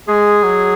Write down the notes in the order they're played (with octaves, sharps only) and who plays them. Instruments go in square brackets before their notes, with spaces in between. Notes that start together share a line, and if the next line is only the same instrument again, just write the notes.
[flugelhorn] G#3 [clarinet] G#4
[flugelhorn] F#3